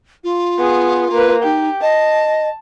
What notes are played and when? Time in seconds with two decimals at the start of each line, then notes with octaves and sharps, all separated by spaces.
0.23 F4
0.58 B3 G#4
1.11 A#3 B4
1.43 D#4 G4
1.81 D#5 A5